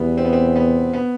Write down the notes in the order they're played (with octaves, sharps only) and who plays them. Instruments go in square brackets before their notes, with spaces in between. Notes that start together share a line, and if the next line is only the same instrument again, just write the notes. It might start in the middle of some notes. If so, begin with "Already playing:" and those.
Already playing: [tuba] E2 [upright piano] G3 B3
[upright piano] C4
B3
C4
B3
B3